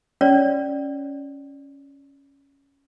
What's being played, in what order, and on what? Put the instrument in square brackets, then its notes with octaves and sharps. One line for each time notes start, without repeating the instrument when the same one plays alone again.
[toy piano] C#4 C#5 D5